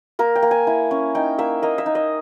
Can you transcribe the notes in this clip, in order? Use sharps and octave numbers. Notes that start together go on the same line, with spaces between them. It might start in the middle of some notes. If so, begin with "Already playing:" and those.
A#3 A#4
G5
A#3
G#5
E4 G#5
C#4
D#4 G5
A#3 E5
A#3 D#5
E5
D#4
D#5